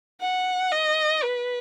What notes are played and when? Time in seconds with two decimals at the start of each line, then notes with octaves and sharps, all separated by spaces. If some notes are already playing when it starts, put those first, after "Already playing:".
0.21 F#5
0.72 D#5
1.23 B4